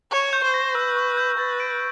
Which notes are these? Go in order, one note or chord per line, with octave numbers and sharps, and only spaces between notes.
C#5 C#6
G6
C5
A#6
B4 E6
C#6
G6
B4 A6
D7